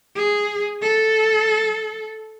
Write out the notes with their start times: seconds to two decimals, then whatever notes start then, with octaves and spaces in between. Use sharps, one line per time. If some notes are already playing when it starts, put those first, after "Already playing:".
0.16 G#4
0.82 A4